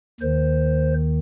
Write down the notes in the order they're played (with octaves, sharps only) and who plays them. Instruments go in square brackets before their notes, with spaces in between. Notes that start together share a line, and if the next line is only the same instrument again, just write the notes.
[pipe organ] D#2 D#3 C5